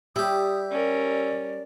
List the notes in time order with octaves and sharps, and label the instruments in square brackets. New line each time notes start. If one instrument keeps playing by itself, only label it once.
[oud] G3 [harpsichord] E4 G4 [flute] D#6
[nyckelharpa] C#4 A#4 [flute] D5